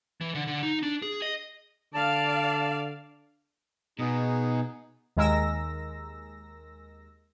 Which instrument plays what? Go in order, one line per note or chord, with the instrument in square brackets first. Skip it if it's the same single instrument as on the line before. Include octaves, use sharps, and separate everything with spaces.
[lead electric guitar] E3
D3
D3
D#4
D4
G#4
D#5
[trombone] D3 [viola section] D5 F5 [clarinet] A5
[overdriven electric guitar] B2 B3 [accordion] D#4 G#4
[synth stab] D#2 G#3 A#4 E6 A#6